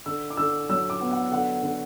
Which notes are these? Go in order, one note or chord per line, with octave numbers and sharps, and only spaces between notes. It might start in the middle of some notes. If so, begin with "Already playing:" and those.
D3 E6
D6
D3 E6
F#3 E6
D6
B3
F#5
D3 F#5
D3